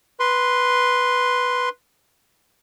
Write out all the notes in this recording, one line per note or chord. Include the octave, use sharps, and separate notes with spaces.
B4 C6